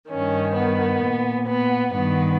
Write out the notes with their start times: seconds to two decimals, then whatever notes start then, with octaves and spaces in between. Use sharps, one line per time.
0.10 G2 D#3 C#4
0.56 B3
1.02 A#2
1.48 B3
1.93 G2 D#3 B3